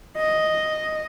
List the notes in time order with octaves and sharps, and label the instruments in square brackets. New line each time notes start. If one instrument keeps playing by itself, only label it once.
[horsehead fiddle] D#5